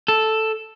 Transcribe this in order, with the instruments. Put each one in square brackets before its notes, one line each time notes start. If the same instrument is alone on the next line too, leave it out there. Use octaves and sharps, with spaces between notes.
[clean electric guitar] A4